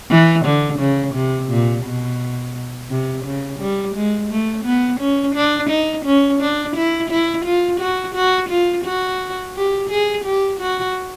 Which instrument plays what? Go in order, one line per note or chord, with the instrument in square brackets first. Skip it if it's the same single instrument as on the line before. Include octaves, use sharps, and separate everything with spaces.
[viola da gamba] E3
D3
C#3
C3
A#2
B2
C3
C#3
G3
G#3
A3
B3
C#4
D4
D#4
C#4
D4
E4
E4
F4
F#4
F#4
F4
F#4
G4
G#4
G4
F#4